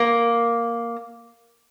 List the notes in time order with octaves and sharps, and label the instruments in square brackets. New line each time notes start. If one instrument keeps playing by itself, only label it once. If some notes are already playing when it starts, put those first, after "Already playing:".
Already playing: [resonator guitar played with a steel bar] A#3